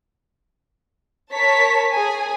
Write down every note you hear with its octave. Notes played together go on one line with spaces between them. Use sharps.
A#4 C#5 A5 B6
G#4 G#5